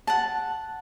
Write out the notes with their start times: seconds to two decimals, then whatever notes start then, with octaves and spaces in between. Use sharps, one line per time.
0.07 F#5 A5